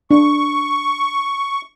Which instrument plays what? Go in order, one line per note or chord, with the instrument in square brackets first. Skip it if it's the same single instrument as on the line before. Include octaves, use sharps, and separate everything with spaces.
[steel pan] D4 [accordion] C#6